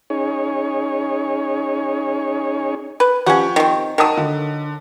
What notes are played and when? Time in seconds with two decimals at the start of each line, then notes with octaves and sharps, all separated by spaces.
0.10 C#4 D#4 G#4 C#5
3.00 B4
3.26 F3 C#4 G4 F#5 C#6
3.56 D#3 C4
3.98 D#3 F#3 A#4 A5 D#6
4.17 D3